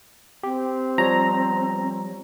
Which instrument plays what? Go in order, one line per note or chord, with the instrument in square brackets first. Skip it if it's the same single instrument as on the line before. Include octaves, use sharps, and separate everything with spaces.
[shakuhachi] C4 [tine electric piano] G4
[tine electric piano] F3 G3 C#5 [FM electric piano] A#5